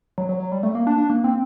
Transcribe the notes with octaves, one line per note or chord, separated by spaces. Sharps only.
F#3
F#3
F#3
G3
A3
A#3
D4
D4
A#3
C4